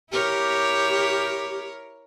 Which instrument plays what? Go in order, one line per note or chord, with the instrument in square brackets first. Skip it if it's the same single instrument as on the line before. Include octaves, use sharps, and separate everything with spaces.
[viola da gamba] E4 A#4 C#5 [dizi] G4